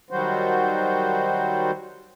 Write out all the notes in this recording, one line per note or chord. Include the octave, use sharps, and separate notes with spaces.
D#3 F#3 G3 F#4 C5